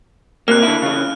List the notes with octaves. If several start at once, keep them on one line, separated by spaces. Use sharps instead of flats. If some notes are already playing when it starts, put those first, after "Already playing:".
C3 A#3 F6 F#6
D3 E4
C#3 E3